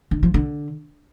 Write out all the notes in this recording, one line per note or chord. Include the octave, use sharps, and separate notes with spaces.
D3
F3
D3